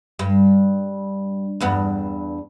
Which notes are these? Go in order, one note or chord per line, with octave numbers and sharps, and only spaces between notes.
G2
E2 G2 B3